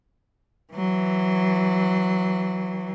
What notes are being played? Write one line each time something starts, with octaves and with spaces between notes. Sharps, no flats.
E3 F#3